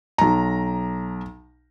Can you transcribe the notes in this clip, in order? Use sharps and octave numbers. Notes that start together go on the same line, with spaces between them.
B1 A#5